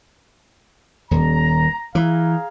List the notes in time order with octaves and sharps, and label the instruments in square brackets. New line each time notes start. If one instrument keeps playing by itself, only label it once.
[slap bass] D#1 [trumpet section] A#5
[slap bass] E3 [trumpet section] G#4 F5 A#5